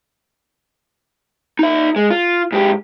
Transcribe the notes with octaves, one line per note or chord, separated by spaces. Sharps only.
D#4 E5
G#3
F4
G#2 G4